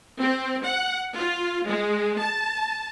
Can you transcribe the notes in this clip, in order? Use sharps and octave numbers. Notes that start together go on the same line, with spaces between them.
C4
F#5
F4
G#3
A5